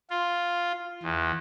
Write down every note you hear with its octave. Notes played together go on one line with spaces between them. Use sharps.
F4
E2